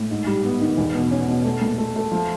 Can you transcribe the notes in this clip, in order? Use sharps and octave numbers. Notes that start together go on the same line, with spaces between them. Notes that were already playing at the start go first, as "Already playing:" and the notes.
Already playing: A2
G#2
G3
B3
D#3
E2
B2
C#4
B2
A3
A#2
A3
A3
F3